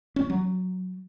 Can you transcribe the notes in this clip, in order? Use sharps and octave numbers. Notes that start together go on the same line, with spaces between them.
C#4
F#3